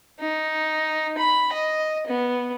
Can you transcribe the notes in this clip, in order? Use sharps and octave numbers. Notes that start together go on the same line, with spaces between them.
D#4
B5
D#5
B3